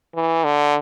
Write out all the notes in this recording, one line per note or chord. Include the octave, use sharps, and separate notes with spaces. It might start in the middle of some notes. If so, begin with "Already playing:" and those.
E3
D3